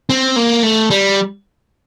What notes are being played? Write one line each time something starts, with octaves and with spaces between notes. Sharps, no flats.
C4
A#3
A3
G3